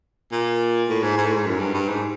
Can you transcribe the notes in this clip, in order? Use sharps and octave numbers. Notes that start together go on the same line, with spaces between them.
A#2
A2
G#2
G#2
A2
G#2
F#2
G2
G2
G#2